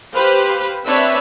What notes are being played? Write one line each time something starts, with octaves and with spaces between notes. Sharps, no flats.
G4 B4 C5 F5
C4 D4 B4 C#5 E5 A5